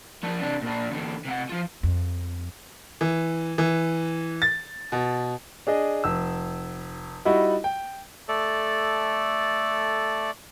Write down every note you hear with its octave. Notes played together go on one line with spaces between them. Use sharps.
F3 D4
C3 D4
A#2 D4
E2 D3
C3 F#5
F3 F4
F2
E3
E3
A6
B2
D4 G#4 D#5
F1 E6
G3 D#4 E4 F#4 D#5
G5
A3 A4 D5